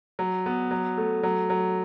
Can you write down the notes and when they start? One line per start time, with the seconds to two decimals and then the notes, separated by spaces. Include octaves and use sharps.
0.19 F#3
0.46 B3
0.71 F#3
0.97 A3
1.23 F#3
1.50 F#3